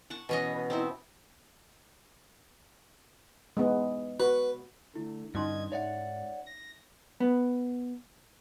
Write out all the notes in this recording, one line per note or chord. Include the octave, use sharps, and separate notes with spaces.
F#5 A5 C#6
B2 E3 C#4 D#5
B2
C4 D#4 E4
G#3 B3
F#4 B4
D3 A3 E4
G2 D3 C#4 D#4 D#5 C6 G#6
G#2 C#5 D5 E5 F#5
A#6
B3